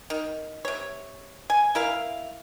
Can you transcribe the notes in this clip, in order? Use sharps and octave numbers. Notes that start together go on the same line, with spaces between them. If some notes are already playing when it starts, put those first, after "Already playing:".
D#3
C3 C#5
G#5
E4 A#4 E5 F5